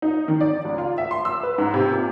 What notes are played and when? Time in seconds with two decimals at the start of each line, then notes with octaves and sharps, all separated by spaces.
0.02 D#4
0.28 D#3
0.41 D5
0.65 C#2
0.78 F4
0.98 E5
1.11 C6
1.25 E6
1.43 B4
1.58 G#2
1.74 C3
1.91 A#2